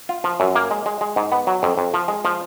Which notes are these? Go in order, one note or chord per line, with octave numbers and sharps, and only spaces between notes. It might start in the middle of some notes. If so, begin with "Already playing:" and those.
F4
F3
F#2
A#3
G#3
G#3
G#3
G#2
B3
F#3
F2
F2
F3
G#3
F3